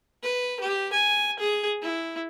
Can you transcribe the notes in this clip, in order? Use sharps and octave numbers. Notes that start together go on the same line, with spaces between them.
B4
G4
G#5
G#4
E4